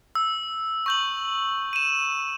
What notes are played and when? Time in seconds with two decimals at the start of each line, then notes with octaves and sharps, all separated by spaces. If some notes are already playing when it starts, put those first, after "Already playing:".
0.15 E6
0.86 C#6 G6 F#7
1.73 D#7 E7